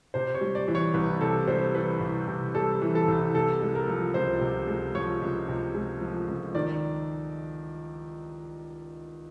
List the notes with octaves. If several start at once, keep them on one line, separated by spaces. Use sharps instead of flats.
C3 C5
C#5
G3
D5
E3
C#5
C2 B4
C3 A4
G3 C5
E3 B4
C2
C3
G3 A4
E3
A4
C2
C3 A4
G#3
A#4
F3
C#2 C5
C3
G#3
F3 C#5
C#2
C3
G#3
F3
C#2
D#3 D5